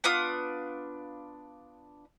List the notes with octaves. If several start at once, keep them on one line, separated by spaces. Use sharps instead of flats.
B3 D4 F4 D#6